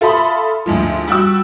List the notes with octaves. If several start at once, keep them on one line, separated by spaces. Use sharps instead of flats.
F4 A4 E5 B5 C6 D#6
D2 G#2 F3
G3 F#4 E6